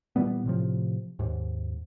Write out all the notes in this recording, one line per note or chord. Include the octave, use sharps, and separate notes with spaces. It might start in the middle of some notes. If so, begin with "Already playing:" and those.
A#2 E3 G3 B3
A2 C3 F3
D#2 G#2